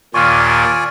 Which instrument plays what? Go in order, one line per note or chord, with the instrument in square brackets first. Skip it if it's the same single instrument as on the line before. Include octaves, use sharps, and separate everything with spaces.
[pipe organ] D#2 A#2 D#3 [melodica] F4 D5 G#5 [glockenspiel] C#6 F6